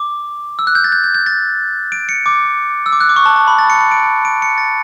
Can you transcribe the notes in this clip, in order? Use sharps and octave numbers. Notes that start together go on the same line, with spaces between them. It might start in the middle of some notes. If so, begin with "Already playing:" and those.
Already playing: D6
E6
F#6
G6
A6
G6
G6
G6
A6
D7
C#7
D6
E6
D6
F#6
D6
C#6
A5
A5
B5
A6
C#7
C#7
D7
D7
C#7
A6